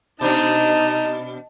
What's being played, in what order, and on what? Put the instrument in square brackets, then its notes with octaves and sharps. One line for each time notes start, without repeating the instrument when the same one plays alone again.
[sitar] B2 D4 [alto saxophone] D#4 [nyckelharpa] D#5 A5